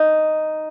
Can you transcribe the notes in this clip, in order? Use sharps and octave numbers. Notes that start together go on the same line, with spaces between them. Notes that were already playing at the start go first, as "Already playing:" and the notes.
Already playing: D#4